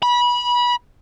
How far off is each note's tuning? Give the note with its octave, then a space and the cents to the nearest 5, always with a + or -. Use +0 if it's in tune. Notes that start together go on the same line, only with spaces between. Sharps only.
B5 -25